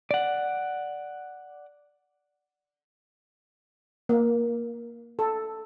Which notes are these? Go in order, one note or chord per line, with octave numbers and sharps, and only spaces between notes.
D5 F#5
A#3
A4